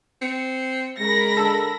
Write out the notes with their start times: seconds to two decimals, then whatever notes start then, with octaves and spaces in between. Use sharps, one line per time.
0.22 C4 C#7
1.00 C#3 G#3 A#4 B5 A#6
1.37 D3 A4 A5 E6